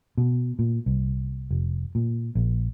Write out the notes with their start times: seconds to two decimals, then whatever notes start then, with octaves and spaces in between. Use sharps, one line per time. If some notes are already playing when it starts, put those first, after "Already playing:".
0.17 B2
0.59 A#2
0.86 C2
1.51 F1
1.95 A#2
2.35 A#1